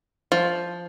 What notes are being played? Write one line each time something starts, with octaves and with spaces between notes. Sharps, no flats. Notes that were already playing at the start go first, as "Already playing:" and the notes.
F3